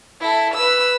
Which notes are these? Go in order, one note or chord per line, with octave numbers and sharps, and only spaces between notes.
E4 A4
B4 E6